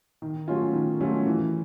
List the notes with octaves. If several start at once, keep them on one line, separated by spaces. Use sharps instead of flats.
D#3
F#3 A3 C#4 F4
D#3
F#3 A3 C#4 F4
E3